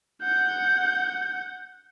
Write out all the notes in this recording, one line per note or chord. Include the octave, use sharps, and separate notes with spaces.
F#5 G6